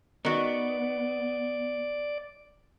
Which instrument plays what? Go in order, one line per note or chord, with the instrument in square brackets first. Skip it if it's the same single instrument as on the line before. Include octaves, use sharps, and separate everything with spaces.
[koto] D#3 F#4 [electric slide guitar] B3 [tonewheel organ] D5